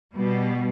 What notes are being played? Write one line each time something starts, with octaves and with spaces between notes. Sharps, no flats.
B2 G3